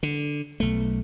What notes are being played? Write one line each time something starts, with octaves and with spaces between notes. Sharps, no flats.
D3
B1 A3